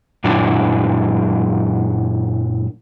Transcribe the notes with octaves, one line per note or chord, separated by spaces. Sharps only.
F#2 A#2 F#3 D4 E4